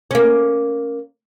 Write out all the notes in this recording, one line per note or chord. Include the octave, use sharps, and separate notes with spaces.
A#3 C#4